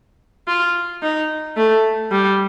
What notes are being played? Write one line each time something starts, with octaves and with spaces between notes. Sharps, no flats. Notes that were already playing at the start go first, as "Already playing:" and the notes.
F4
D#4
A3
G3